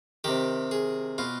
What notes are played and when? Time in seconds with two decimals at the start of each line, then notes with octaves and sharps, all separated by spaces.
0.24 C3 D#3 G4
0.71 G#4
1.18 B2 F4